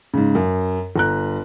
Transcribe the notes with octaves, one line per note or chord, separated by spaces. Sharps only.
G#2 C#3
F#2
G1 A#5 F#6